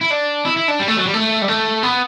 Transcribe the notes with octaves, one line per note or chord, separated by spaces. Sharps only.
E4
D4
E4
E4
D4
G3
A3
F#3
G3
A3
G3
A3
B3